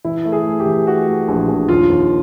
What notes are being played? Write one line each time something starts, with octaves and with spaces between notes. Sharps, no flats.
E3 E4
A3
G#4
A3
G4
E3
A3 F#4
A3
A#1
A#1
D#2 F4
D#2